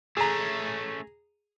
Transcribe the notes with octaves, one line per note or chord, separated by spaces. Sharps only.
A3 C#4 G#4 A#5